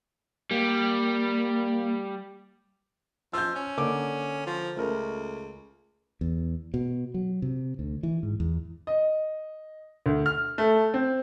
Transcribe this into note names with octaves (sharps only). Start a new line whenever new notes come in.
G3 A#3
F3 E6 G6
C#4
D3 A#3 D6
F3
C#2 A3 A#4
E2
B2
F#3
C3
D2
E3
G#2
E2
D#5
D2
F6
A3
C4